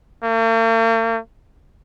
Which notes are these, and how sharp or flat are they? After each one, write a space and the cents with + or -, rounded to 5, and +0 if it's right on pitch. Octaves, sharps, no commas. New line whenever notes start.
A#3 -45